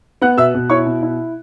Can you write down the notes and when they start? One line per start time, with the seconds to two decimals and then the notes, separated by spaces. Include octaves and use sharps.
0.22 B3 F#5 F#6
0.38 B2 E5 E6
0.54 B2
0.70 E4 C#5 C#6
0.86 B2
1.03 E4